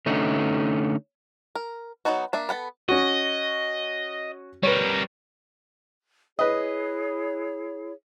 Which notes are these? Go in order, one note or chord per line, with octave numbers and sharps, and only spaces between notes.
D3 A3 C#4 D#4
A#4
F#3 G#3 B3 D#4 F#4
A#3 D4 E5
B3 A4 F#5 B5
C#4 F#4 D#5
G3 A#4 B4 C#5
E4 G#4 B4 C#5 D#5